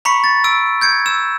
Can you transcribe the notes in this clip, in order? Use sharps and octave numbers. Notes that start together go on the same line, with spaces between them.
A#5 B5 C#6 B6 C#7
A6
E6 D7
G6 G#6 C#7
E6 E7